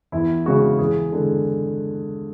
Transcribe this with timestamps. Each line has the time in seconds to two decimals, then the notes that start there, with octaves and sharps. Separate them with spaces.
0.12 E2 E4
0.46 C#3 G#3 F#4
0.79 E2 G#4
1.12 D3 G#3